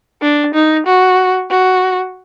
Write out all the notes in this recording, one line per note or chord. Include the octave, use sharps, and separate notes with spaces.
D4
D#4
F#4
F#4